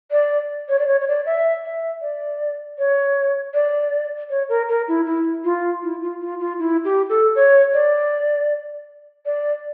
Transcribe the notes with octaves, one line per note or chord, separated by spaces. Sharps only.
D5
C#5
D5
C#5
C#5
D5
E5
E5
D5
C#5
D5
C#5
A#4
A#4
E4
E4
F4
E4
F4
F4
F4
E4
G4
A4
C#5
D5
D5